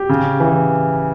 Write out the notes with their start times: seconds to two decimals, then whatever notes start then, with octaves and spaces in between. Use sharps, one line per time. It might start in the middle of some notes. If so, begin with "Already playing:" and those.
Already playing: G4
0.09 C#3
0.40 E3